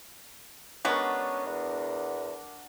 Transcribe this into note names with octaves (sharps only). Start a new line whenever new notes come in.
G#3 B3 C#4 D4 F#4 A#4
E2